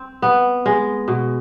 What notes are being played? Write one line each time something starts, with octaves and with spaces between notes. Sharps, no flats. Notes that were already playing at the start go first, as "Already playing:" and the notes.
Already playing: C4
B3
G#3
B2